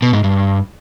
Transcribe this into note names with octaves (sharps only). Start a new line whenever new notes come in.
B2
G#2
G2